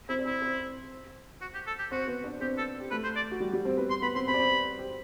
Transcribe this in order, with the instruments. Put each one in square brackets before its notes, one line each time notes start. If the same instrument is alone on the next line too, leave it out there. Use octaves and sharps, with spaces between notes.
[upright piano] C4 C5 [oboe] E4
[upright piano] D5
[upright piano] C4 C5 [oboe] E4
[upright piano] C4 C5
[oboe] F#4
G4
A4
G4
[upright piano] C4 C5 [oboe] F#4
[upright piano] B3 B4
D4 D5
[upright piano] C4 C5 [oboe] G4
[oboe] A4
[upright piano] G4
[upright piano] A3 A4 [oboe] B4
[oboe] C5
D5
[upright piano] F#4
G3 G4
G3 G4
C4 C5
B3 B4
[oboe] C6
[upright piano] B3 B4 [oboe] B5
[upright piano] C4 C5 [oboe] C6
[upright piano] C4 C5 [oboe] B5
[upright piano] D5
C4 C5
G4